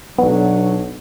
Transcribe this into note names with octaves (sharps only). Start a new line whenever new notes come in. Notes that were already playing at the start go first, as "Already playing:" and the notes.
B1 F#3 B3 D4